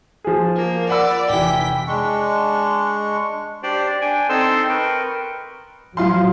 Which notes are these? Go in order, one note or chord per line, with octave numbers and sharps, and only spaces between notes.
F3 G#4
A#3
D5 F#5 B5 E6
F1 E3 G5 B6
G#3 D4 C#6
D4 G4 C5 D5
D4 G5 G#5
C4 D#4 A4 C5 C6 E6
A#4 B4 G5 C#6
F#3 F4 F5 C6